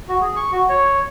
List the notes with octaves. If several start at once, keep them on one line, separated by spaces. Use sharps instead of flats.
F#4
G#4
C#6
F#4
C#5